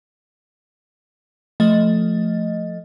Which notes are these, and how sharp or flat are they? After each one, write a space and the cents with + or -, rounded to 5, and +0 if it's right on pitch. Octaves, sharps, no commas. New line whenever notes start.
F3 +0 A3 +0 D#5 +0